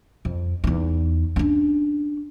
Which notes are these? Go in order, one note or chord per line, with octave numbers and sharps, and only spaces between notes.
F2
E2 D#4
C#4 D4